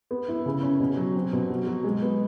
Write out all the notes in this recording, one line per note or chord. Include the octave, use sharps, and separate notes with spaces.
B3
E4
C#3
C#4
B2
F#3
C4
B2
F#3
F#3
G#3
B3